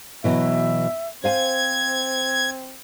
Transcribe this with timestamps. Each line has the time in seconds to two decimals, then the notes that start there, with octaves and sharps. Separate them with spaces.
0.24 B2 E3 F#3 E5
1.24 C4 C5 F5 G#5 G#6